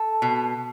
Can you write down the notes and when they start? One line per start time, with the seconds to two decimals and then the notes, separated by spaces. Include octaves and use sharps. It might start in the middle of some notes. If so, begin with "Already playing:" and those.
Already playing: A4
0.22 B2